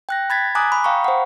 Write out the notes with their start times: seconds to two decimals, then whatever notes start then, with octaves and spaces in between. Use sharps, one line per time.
0.09 G5 F#6 A#6
0.30 B5 G#6 A6 B6
0.55 G#5 A#5 D6 D#6 F#6
0.72 B5 D#6
0.84 F5 G5 A#5 B5 C#6
1.04 C5 F#5